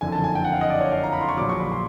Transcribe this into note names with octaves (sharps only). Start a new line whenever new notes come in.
F#1 F2 D3 G#5
A5
G#5
G5
F#5
F5
D#5
D5
C#5
F5
A#5
B5
C6
C#6
A#1 A#2 F#3 D6
C#6
B5
C6